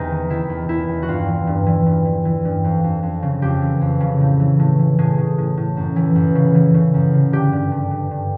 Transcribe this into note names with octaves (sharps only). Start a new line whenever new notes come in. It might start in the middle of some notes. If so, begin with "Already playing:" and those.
Already playing: E2 C3 D#4
D#3
D#3 E4
E2
E2 E4
E2
F#4
G2 F4
E3
G2
E3
G2
E3
E3
G2
F2
F2
F2
C#3
F2 G4
E3
F2
C#3
A2
E3
A2
E3
A2 G#4
A2
A2
A2
F#2
E3
F#2
C#3
E3
C#3
F#2
C#3
D3 G4
G2
G2
G2
G2